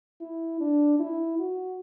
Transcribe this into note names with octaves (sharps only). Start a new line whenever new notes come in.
E4
D4
E4
F#4